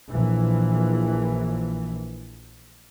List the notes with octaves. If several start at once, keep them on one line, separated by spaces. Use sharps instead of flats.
A#1 E3